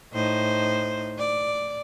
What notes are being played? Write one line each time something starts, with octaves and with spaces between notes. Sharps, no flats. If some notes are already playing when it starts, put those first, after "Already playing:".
A2 D#4 C5
D5